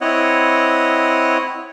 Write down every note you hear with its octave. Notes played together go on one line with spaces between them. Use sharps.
C4 E4 C#5 D#5 F#5